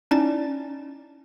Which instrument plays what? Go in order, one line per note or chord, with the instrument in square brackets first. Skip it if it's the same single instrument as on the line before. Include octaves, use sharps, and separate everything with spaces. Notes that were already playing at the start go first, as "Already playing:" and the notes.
[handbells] C#4 D#4 E4 D5 A5 A6